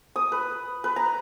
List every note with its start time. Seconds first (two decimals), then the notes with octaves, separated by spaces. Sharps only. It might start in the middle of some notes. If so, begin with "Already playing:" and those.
0.16 D#6
0.32 B4
0.84 B4
0.96 A#5